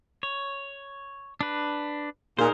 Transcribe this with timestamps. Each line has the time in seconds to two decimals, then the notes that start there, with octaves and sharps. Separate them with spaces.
0.23 C#5
1.41 D4 B4
2.39 A#2 D#4 G#4 A#4 C5